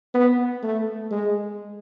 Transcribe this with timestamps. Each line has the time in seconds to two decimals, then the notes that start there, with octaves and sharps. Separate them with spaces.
0.14 B3
0.63 A3
1.12 G#3